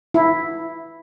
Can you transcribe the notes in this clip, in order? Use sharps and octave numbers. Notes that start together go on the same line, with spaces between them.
E4